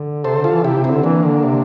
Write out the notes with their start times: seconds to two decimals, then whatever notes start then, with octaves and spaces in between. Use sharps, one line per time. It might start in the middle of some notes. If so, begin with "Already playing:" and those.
Already playing: D3
0.24 C3 A4 C5
0.38 D3
0.44 F4 A4
0.52 E3
0.64 C3 E4 G4
0.77 C3
0.84 C4 E4
0.90 D3
1.03 E3 A#3 D4
1.24 D3
1.44 C3